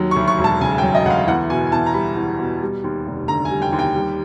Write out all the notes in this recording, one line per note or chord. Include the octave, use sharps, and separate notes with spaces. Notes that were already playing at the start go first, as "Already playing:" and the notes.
Already playing: D#2 F#3
C#6
D2
C#6
E1
A5
C#3 G#5
G5
F#3
D#5
D2 F#5
F5
E2 F#5
B2 G#5
G#5
E2 A5
A#5
G3 B5
E2
B2
G3
D#2
F1
D3 A#5
G#5
G3
G5
D#2
G5
G3